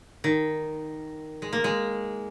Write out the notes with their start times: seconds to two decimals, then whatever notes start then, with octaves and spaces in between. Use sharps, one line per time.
0.24 D#3
1.42 G#3
1.53 A#3
1.64 G#3